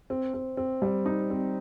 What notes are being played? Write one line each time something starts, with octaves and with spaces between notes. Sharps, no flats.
C4
C4
C4
G3
D#4
C4